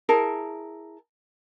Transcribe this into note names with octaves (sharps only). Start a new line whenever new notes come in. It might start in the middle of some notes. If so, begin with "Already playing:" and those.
E4 G#4 A#4 A5